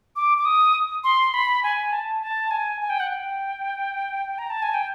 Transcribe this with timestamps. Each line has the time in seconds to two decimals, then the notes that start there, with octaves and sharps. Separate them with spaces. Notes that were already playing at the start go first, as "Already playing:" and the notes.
0.16 D6
0.38 D6
0.45 D#6
1.04 C6
1.34 B5
1.63 G#5
1.92 A5
2.21 A5
2.51 G#5
2.81 G#5
2.90 G5
3.00 F#5
3.10 G5
4.38 A#5
4.50 A5
4.63 G#5
4.74 G5